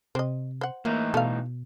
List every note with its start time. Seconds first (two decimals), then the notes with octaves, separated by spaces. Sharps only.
0.15 C3 C5 D#5
0.61 C5 F#5
0.85 A2 E3 A#3 D#4
1.14 B2 A4 F5